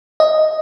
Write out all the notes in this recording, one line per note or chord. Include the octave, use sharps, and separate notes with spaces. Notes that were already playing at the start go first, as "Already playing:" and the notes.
D#5